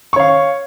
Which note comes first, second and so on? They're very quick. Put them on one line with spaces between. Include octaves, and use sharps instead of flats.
C#6 C#5 F5